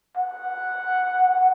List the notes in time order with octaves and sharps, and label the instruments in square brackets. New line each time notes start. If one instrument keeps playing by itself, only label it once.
[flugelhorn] F#5